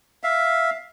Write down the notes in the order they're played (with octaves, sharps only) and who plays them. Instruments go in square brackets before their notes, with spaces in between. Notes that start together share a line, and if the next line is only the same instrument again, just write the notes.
[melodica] E5 F5